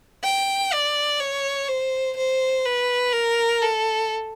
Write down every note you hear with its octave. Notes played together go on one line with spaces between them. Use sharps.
G5
D5
C#5
C5
C5
B4
A#4
A4